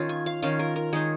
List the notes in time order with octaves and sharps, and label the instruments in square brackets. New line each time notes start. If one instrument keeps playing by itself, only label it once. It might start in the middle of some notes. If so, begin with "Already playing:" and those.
Already playing: [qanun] D#3 C#4 F4
G#5
F5
D#3 C#4 F4 F5
A#4
A#4
D#3 G#3 D#4 G#4